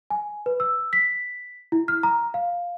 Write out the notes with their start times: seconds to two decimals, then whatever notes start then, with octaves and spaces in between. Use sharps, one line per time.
0.10 G#5
0.46 B4
0.60 E6
0.93 B6
1.72 E4
1.88 F6
2.03 A#5
2.34 F5